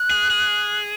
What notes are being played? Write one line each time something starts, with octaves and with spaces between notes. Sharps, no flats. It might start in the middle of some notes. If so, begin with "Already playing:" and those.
Already playing: F#6
G#4
G#4